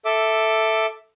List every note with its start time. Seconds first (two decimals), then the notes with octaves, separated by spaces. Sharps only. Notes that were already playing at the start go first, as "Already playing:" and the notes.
0.05 A4 E5 D6